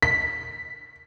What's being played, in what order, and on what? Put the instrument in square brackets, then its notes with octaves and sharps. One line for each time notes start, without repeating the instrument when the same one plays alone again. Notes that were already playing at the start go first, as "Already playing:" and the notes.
[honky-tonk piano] B6